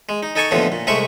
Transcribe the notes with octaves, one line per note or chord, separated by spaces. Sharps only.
G#3
D#4
D#4 A4 G#5 A5 C#6
D#2 A2 D3 E3 F3 B3
A#2
C2 C3 G#3 A3 E5 C#6